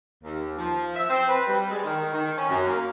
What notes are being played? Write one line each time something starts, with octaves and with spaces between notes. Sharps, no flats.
D#2
F3
E5
C4
B4
G3
G#3
D#3
D#3
C#4
F#2
A#3